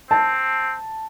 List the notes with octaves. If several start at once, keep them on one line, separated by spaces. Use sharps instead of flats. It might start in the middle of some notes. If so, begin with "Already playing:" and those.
C4 A5